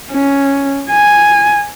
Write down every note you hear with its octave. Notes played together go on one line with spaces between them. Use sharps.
C#4
G#5